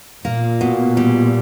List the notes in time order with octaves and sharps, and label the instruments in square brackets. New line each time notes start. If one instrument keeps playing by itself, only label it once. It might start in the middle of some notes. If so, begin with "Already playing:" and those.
[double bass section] A#2 [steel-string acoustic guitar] A#3
[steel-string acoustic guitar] B2
G3